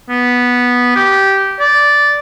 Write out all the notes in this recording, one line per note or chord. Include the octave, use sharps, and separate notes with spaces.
B3
G4
D5